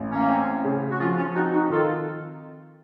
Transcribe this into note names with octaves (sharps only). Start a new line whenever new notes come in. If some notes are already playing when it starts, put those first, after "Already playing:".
Already playing: A1
A#3 C#4
C4
C#3
F#4
F3 C#4 F4
C#4 F4
C4 D#4 F#4
D#4 F#4
D#3 F4 A4